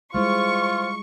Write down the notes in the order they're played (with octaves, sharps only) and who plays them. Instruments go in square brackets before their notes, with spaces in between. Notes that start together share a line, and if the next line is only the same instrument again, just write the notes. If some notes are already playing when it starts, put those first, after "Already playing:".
[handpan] G3 G#3 E4 [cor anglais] F4 [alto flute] C5 [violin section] C#6